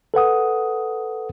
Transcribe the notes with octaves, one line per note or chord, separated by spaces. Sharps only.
A4 B4 F#5 D#6